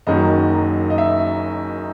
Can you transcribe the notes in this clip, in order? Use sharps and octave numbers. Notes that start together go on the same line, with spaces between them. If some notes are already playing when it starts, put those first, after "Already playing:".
F#1 F#2 D#3 F#3 D#5
D#5
E5